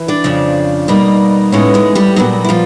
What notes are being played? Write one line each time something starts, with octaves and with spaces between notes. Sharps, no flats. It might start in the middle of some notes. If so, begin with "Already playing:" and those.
Already playing: E3
D4 D5
F2 C#3 F3
B2 G3 A#3 D#4
A2 E3 G#3 B3 C#4 D#4 C#5
G#3 G#4
G3 G4
A#2 F#3 G3 B3 D#4 F#4
E4
F3 F4